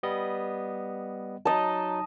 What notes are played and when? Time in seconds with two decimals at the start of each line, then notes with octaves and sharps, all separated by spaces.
0.03 G3 B3 D#5
1.45 F#3 D#4 D#5 A5